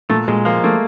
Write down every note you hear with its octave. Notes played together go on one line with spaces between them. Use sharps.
A#2 A3
A#2 G#3
F3 A#3
A3 A#3